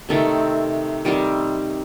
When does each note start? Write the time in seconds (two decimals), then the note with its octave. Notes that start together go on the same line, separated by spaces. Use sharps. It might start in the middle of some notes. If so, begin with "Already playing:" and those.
0.09 C3 D#3 A3 C4
1.05 D#3 G3 C4